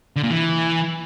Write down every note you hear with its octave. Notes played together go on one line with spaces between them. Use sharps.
D3
A#2
E3